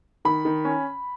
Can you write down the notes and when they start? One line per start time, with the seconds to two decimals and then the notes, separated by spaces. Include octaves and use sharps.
0.25 D#3 B5
0.45 D#3
0.65 C#4